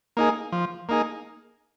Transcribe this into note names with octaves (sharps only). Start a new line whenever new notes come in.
A#3 D#4 G#4
F3
A#3 D#4 G#4